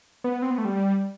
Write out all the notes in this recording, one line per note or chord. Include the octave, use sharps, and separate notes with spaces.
B3
C4
B3
A3
G3